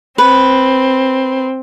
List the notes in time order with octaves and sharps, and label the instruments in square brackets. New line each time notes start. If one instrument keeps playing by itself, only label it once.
[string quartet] C4 [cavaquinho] B4